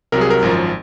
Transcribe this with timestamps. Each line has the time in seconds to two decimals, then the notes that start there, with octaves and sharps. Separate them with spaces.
0.12 C2 C3 F#3 A#4
0.21 G#4
0.30 A#4
0.42 G#1 F#2 F3